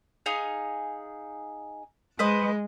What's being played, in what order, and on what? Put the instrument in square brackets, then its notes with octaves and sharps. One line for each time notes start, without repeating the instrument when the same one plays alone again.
[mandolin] D#4 G#4 F5
[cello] G#3 [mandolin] B4 C5 D#5